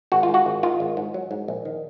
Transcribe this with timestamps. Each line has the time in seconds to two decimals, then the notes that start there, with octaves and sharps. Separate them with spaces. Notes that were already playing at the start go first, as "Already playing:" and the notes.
0.12 G#1 F#4
0.23 F4
0.29 G#2 F#4
0.46 G#1
0.63 D#3 F4
0.80 G#1
0.97 G#2
1.14 F#3
1.31 G#2
1.48 A#1
1.65 D#3